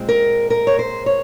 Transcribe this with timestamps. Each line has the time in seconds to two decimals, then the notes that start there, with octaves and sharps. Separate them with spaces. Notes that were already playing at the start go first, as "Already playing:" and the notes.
Already playing: A#2 G#3 C4
0.09 A#4
0.50 A#4
0.67 C#5
0.79 C5
1.06 C#5